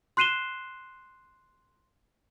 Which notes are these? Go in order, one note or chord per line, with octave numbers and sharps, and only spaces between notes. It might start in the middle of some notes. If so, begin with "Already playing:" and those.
C6 F#6 C7 D#7 E7 G7